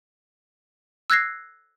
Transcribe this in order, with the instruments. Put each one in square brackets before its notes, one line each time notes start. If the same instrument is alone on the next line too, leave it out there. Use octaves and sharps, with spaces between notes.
[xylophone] E6 F#6 G#6 A#6 C7